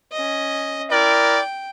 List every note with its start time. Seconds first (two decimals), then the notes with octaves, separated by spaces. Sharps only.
0.12 C#4 D#5
0.91 E4 A#4 D5 G5